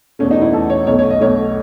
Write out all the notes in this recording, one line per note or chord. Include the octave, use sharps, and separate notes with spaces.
E2 B2 A3 C#4
D#4
F#4
E4
E2 B2 A3 A4
C#5
B1 B2 A3 C#5
C#5
D#5
B1 B2 A3 C#5